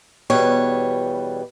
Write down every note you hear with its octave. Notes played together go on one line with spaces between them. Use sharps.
E2 B2 G3 B4 C#5